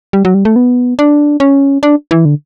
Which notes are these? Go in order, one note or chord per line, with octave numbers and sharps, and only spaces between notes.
G3
F#3
G3
A3
B3
D4
C#4
D4
E3
D3